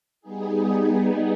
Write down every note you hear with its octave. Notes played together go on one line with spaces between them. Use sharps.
G3 B3 D#4 G#4